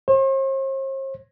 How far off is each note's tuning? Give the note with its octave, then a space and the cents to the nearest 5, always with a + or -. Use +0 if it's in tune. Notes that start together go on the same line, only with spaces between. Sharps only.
C5 +45